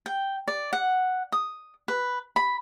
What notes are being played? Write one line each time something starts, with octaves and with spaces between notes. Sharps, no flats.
G5
D5
F#5
D#6
B4
B5